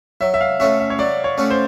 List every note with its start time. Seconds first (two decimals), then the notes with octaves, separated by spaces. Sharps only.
0.21 F#3 E5
0.34 E5
0.41 F5
0.60 A3 C#4 F#4 E5
0.80 E5
0.90 C#5
0.99 F#3 D5
1.24 C#5
1.38 A3 C#4 F#4
1.50 C5